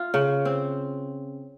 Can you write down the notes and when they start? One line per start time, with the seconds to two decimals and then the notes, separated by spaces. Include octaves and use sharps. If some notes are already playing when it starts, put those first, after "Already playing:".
Already playing: F4
0.14 C#3
0.45 C4